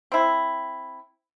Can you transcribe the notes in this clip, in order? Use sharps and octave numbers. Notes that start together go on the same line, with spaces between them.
C4 E4